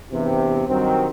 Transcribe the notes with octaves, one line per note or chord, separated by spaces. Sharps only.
E2 G2 C3
G2 D#3 F#3 C4